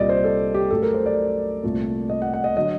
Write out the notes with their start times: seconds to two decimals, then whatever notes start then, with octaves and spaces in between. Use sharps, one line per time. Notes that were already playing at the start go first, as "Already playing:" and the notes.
Already playing: C2 A#2 G3 D5 D#5
0.09 C5
0.24 A4
0.54 G4
0.71 F#2 F#3 A3 A4
0.82 A#4
0.94 C5
1.06 D5
1.63 C2 A#2 A3
2.10 D#5
2.22 F#5
2.34 F#5
2.44 D#5
2.57 D3 F#3 D#5